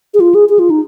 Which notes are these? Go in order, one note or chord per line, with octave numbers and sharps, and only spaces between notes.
G#4
F4
G#4
G#4
F4
D#4